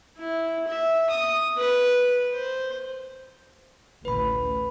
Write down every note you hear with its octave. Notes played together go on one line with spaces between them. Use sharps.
E4
E5
D#6
B4
C5
A1 D2 B4 B5